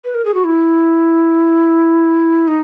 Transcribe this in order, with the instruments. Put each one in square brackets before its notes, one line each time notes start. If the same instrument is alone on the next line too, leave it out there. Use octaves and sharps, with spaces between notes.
[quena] B4
A#4
G#4
F#4
E4
D#4